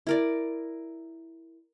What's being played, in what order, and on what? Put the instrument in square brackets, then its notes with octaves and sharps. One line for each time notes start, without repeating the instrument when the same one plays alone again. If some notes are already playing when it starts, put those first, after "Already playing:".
[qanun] E4 A#4 D5